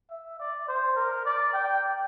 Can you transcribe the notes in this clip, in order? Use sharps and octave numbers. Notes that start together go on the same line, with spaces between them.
E5
D5
C5
A#4
D5
G5